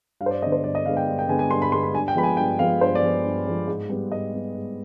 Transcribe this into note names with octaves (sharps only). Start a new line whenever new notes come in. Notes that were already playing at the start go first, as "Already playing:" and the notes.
G2 F5
C5
D5
D3 G#3 B3 D#5
C5
G2 D5
D#5
D3 G#3 B3 F5
G5
G2
G5
D3 G#3 B3 G#5
G#5
G2 C6
B5
D3 G#3 B3 C6
B5
G2 G#5
G5
F3 G#3 B3 B5
G#5
G2 G5
F3 G#3 B3 F5
G2 C5
D5
F3 G#3 B3
G2
F3 G#3 B3
G#2
G3 B3
G#2 D#5
G3 B3
G#2